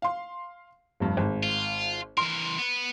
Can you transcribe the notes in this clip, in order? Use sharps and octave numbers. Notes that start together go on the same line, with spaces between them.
F5 C6
F1 G2
G#1
F4
E3 A#4 C6
B3 B4